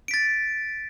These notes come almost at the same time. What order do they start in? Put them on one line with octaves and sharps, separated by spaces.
D7 B6 A6